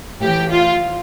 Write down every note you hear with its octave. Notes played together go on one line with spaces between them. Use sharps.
A2 E3 G4
F4